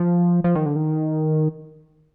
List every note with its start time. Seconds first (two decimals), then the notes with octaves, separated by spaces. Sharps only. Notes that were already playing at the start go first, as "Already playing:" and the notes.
Already playing: F3
0.44 F3
0.55 D#3
0.66 D3
0.76 D#3